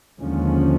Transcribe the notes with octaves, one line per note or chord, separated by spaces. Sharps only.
D#2 D3 F3 G#3 C#4